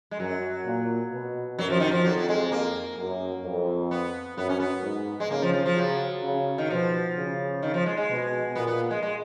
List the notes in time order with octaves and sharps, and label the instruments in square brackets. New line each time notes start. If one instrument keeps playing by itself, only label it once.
[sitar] G#3
[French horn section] F#2 [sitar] F#3
[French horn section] A#2
B2
[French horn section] F#2 [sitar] F#3
[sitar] F3
D#3
F3
[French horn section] F2 [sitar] F#3
[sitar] F#3
G#3
A#3
[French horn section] F#2
F2
[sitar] B3
[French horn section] F#2 [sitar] B3
[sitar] C#4
B3
[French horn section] G#2
[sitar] G#3
[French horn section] C#3 [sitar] A#3
[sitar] F3
F3
F3
[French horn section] C#3 [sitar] F#3
[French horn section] C#3
[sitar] D#3
[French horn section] B2 [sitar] F3
[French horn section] C#3
[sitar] D#3
F3
G#3
G#3
[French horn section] B2
[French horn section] A#2 [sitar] B3
[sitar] B3
G#3
G#3